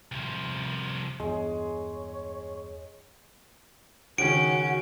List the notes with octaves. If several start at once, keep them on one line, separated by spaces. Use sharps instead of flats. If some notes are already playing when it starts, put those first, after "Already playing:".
C2 F3
E2 G2 G#3 C#5
C#2 D#3 C#4 F#4 D7